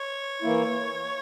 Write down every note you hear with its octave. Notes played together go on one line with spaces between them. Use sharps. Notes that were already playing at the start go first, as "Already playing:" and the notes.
Already playing: C#5
E3 A#3 E4